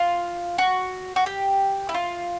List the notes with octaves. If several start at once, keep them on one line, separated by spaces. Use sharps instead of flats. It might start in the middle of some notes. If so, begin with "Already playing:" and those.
Already playing: F4
F#4
F#4
G4
E4
F4